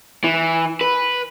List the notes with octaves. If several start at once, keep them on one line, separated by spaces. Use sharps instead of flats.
E3
B4